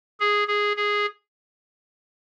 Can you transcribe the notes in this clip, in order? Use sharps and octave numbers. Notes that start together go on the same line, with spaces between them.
G#4
G#4
G#4